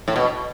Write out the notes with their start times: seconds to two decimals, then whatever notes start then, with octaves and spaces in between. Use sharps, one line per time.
0.08 A2
0.16 B2